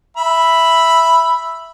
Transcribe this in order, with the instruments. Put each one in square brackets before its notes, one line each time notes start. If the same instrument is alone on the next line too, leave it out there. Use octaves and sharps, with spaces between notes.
[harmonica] E5 B5